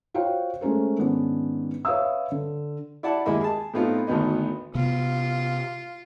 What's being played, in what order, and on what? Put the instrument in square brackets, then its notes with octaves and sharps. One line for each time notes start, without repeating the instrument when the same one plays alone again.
[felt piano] F4 F#4 C5 C#5 F5 G5
G#3 A3 C#4 A#4 C5
G#2 D#3 B3 C#4 D4
B4 C#5 E5 F5 D#6 E6
D3
[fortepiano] E4 D5 F#5 A5
D#2 G#3 A#3 E4 D#5 B5
G#4 A5
A2 A3 B3 C4 D#4 F4
G#1 D2 D#3 B3 D#5
[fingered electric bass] C3 B3 [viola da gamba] F4